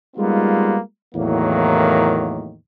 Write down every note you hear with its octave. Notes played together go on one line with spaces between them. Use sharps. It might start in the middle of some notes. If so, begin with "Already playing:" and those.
G3 G#3 A#3 B3 D#4 F4
E2 A2 D#3 F#3 A#3